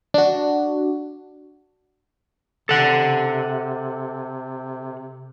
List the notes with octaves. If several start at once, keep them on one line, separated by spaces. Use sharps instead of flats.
D4 F#4
C3 A4 F#5